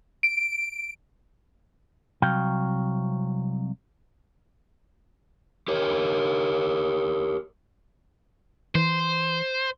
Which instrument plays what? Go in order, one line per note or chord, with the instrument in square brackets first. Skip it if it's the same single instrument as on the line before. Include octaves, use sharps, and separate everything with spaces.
[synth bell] D7
[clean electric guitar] C2 C3 F#3 F5 G5
[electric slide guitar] G4 A#4 C#5
[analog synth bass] E3 [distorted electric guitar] C5